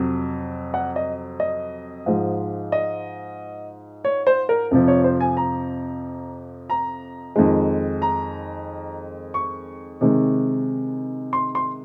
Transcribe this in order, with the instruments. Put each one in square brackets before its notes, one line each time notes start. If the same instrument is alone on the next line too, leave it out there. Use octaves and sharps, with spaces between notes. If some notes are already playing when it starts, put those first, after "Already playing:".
Already playing: [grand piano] F2 C3 F#3
F#5
D#5
D#5
G#2 F3 G#3
D#5
C#5
C5
A#4
F2 C3 F3
C#5
C5
G#5
A#5
A#5
F2 D#3 G#3
A#5
C#6
C3 D#3 G#3
C6
C6